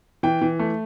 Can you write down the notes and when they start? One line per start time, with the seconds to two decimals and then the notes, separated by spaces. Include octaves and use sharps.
0.23 E3 G5
0.42 E3
0.59 A3